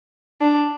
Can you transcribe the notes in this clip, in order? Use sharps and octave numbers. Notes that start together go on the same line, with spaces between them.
D4